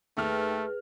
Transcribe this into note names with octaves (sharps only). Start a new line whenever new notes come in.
D#2 A3 G#4 B4 F6